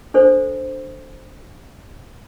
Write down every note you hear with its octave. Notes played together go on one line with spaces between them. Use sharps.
D4 A4 C5